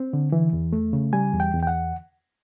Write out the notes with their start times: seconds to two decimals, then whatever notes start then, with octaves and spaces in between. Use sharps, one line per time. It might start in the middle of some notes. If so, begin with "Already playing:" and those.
Already playing: C4
0.13 D3
0.32 E3
0.53 E2
0.73 A3
0.93 C#3
1.13 G3 G#5
1.34 E2
1.40 G5
1.54 E2
1.63 G5
1.67 F#5